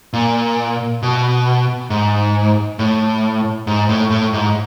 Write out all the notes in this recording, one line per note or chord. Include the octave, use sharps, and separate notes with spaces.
A#2
B2
G#2
A2
G#2
A2
A2
G#2